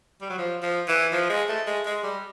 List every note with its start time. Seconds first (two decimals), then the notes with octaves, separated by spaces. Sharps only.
0.21 G3
0.30 F#3
0.38 F3
0.62 F3
0.88 E3
1.12 F3
1.30 G#3
1.49 A3
1.67 G#3
1.86 G#3
2.03 G3